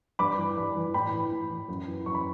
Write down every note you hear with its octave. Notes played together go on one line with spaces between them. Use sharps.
G2 B5 D6
E3
G2
E3
A2 G5 B5
E3
A2
E3
F#2
E3
F#2 C#6
B5